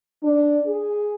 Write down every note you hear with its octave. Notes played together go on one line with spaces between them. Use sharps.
D4
G#4